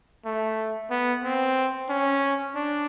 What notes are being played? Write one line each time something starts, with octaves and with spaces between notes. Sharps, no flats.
A3
B3
C4
C#4
D4